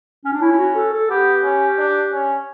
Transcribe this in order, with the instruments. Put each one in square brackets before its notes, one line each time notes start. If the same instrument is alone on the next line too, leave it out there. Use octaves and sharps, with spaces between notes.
[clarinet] C#4
D4
[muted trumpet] C#4 [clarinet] E4
[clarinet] E4
F#4
A4
A4
[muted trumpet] B3 [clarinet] G4
[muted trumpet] C#4
D4
C#4